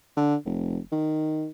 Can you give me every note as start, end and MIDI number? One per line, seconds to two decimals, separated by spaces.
0.17 0.35 50
0.45 0.78 29
0.92 1.48 51